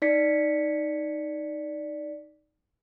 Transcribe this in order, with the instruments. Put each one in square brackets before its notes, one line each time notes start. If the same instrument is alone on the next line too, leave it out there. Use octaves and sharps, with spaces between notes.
[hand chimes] D#4 D5 B6 C#7